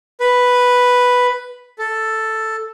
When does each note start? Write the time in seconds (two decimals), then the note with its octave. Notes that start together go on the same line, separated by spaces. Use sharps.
0.20 B4
1.79 A4